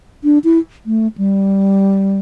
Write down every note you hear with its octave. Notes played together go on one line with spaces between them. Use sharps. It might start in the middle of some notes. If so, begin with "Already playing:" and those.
D4
E4
A3
G3